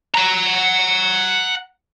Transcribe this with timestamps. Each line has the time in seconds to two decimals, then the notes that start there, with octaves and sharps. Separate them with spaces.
0.15 F#5 A#5